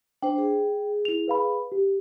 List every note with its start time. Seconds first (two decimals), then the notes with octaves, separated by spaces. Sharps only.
0.22 D4 C5 G5
0.38 G#4
1.05 E4 F7
1.28 B4 F5 B5
1.72 G4